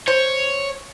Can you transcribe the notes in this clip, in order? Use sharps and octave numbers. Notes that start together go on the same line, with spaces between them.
C5 C#5